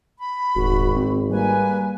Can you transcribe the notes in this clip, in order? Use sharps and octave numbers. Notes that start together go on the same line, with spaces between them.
B5
D#1 G#1 F#4
C4
G3 A#3 B4 G#5